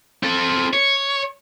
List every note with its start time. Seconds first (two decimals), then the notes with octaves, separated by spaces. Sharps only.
0.23 C4 A4
0.73 C#5